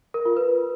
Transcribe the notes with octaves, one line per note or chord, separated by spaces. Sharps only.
A#4
F4
B4